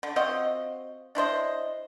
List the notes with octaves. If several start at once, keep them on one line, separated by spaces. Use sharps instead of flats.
D3
C4 F4 F#4 D#5
D4 E4 C5 D#5